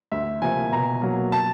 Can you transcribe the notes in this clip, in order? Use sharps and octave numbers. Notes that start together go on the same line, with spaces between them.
D2 E5
C3 F3 A#3 G#5
B2 A#5
F#3 A#3
A5